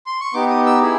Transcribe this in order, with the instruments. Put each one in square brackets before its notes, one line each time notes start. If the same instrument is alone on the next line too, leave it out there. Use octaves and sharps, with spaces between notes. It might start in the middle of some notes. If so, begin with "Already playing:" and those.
[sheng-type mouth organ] C6
C#6
B3 D#4 G4 D6
D#6
E6
E4 G#4